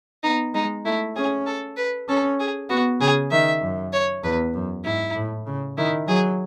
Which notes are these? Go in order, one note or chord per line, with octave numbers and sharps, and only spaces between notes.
B3 D#4
G#3 D#4
A3 E4
C#4 G#4
A4
B4
C#4 A4
G#4
B3 F#4
C#3 G#4
D#3 E5
F#2
C#5
E2 B4
F#2
G#2 E4
A2
C#3
D#3 E4
F#3 G#4